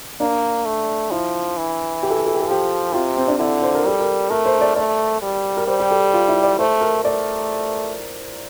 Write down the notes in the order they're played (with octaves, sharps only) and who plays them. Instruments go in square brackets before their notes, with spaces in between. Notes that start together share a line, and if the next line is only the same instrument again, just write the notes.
[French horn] A#3 [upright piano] D4
[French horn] A3
[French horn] F3 [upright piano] E4
[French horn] E3
[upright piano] G4
A4
G4
A4
G4
A4
[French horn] F3 [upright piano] G4
[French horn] C3 [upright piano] F4
[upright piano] C4
D4
[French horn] D3 [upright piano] E4
[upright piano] C5
A#4
[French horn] G3 [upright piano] A4
[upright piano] A#4
[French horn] A3 [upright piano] A#4
[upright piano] C5
D5
[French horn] A3 [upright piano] D5
[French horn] G3
[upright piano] A#4
[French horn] G3 [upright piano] C5
[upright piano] G4
A4
F4
E4
D5
[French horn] A3 [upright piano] C5
[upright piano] A#4
[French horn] A3 [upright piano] D5